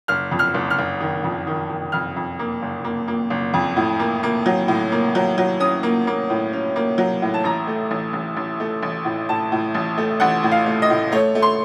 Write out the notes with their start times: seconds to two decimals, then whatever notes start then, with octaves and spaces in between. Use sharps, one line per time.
0.08 F#1 F6
0.31 F2
0.39 F6
0.54 F#1
0.70 F6
0.78 F#1
1.00 D#3
1.24 F2
1.47 D#3
1.70 D#3
1.92 F2 F6
2.16 F2
2.39 A#3
2.62 F#1
2.84 A#3
3.08 A#3
3.30 F#1
3.54 F2
3.76 A2
3.99 A#3
4.23 A#3
4.46 F#3
4.68 A2
4.92 A#3
5.15 F#3
5.38 F#3
5.60 C#4 D#6
5.83 A#3
6.07 A#3
6.30 A2
6.53 C#4
6.76 A#3
6.98 F#3
7.22 A2
7.34 A5
7.44 A1 A#5
7.67 A3
7.91 A1
8.13 A1
8.37 A1
8.60 A3
8.82 A1
9.05 A2
9.29 A2 A5
9.52 A2
9.75 A1
9.97 A3
10.20 A1 F#5
10.43 A2
10.52 F5
10.66 A3
10.82 D#5
10.90 A2
11.12 A3 C#5
11.35 A3
11.42 C6